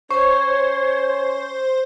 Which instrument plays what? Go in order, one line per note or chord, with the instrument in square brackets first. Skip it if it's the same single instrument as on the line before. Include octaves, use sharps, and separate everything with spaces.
[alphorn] C#4 [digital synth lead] C5 [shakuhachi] C#5 [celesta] C#6